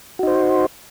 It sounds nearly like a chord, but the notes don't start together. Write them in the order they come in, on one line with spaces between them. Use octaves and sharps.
F#4 D#4 C5